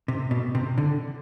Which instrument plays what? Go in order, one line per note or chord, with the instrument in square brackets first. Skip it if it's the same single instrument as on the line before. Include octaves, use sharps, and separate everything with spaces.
[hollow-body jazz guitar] C3
B2
C3
D3